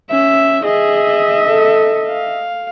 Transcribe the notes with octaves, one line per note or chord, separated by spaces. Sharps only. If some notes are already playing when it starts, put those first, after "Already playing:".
C#4 E5
G#4 D#5 E5
A4
F5